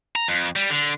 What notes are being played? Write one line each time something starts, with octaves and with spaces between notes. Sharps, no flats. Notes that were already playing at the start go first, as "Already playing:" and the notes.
A#5
F2
G3
D3